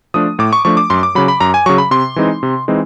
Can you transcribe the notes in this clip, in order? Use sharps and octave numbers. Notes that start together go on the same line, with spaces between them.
F3 A3 D4 D#6
A2 D6
C#6
F3 A3 D4 C#6
D6
F#2 C6
D6
C#3 F#3 B5
B5
F#2 A#5
G#5
C#3 F#3 C#6
B5
C3 C6
E3 G#3 C4 D#4
C3
E3 G#3 C4 D#4